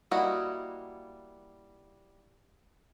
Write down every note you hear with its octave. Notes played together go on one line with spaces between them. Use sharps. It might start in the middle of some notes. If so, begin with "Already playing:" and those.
G3 A#3 E4 F#4 D#5